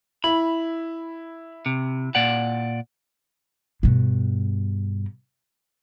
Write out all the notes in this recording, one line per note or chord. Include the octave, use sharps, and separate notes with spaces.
E4 B5
C3
A#2 D5 F#5
G2 B2